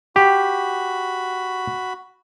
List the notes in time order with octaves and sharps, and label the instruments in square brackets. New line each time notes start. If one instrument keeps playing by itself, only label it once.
[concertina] F#4 B5 [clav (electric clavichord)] G4